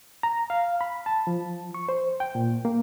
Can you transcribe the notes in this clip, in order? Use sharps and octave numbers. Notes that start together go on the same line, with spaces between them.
A#5
F5
B5
A5
F3
C#6
C5
G5
A#2
A#3